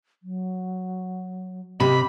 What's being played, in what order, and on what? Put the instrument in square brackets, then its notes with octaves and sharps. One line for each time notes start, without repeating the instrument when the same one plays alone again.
[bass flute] F#3
[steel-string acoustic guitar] C3 [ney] G4 [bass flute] D#5 [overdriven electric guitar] B5